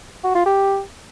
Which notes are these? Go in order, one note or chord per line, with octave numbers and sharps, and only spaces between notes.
F#4
F4
G4